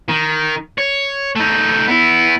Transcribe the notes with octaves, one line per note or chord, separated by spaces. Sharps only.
D#3
C#5
A3 D#4
B3 E4